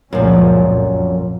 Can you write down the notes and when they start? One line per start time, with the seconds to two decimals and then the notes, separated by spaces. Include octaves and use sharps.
0.13 C#2 F#2 A#2 F3 C#4
0.56 A#1 F2